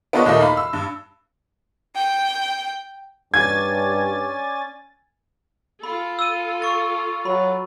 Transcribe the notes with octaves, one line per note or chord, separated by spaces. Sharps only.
B3 D4 F4 B4 C#5 D#5
D#2 A#2 A3 A#3 D#5
D#4 F5 B5
E6
G2
G5
G2 C#4 D5 G#5 G#6 A6
F4 A4 B5
E6 D#7
C#6 A6
F#3 B5